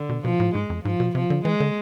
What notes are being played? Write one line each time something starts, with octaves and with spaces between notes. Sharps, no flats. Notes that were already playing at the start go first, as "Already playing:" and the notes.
Already playing: D3
B2
B2 F3
A2
G#2 G#3
F2
G#2 F3
B2
C3 F3
D3
E3 G#3
D3